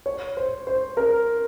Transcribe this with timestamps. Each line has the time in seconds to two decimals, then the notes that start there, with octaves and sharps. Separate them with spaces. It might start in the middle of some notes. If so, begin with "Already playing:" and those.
0.06 C#5
0.37 C5
0.67 C5
0.97 A#4